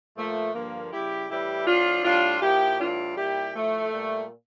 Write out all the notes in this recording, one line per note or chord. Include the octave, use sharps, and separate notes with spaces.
A#2 F3 A3
G2 D3 F3 A#3
C#3 G3 E4 G4
A2 E3 G3 E4 G4
A2 F3 D4 F4
A2 G3 D4 F4
A#2 F3 E4 G4
A2 E3 G3 D4 F4
A#2 G3 E4 G4
A2 F3 A3
A#2 G3